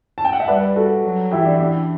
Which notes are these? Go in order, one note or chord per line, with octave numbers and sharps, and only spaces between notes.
A5
G5
F#5
E5
G3 B4 D5
F#4 A4
F#3
E3 E4 G4
D4
D4